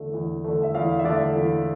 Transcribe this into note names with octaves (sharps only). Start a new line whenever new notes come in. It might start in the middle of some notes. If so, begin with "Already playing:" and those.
Already playing: E2 D3 A3 E5
E2
D3 A3
E5
E2 F5
E5
D3 A3 D5
E2